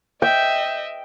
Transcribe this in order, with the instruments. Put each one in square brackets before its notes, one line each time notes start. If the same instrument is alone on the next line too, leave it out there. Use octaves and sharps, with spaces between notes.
[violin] D#5 E5 [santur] G5